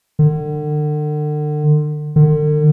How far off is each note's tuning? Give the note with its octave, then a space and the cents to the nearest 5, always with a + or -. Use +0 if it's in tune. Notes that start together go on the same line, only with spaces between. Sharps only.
D3 +40
D3 +45